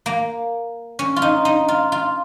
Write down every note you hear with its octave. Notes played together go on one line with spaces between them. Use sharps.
A#3
C#4
F4
D#4
D#4
F4
F4